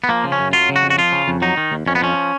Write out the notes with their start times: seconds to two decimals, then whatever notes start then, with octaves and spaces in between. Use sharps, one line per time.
0.04 B3
0.09 F3 A#3
0.24 C#3
0.32 C#4
0.39 F#2
0.53 F#3 F4
0.69 C#3
0.76 F#4
0.83 F2
0.90 F#4
0.98 F3 F4
1.12 C#3
1.28 F2
1.42 F#3 D#4
1.57 D#3
1.72 D#2
1.86 F2 C#4
1.95 B3
2.02 F3 C#4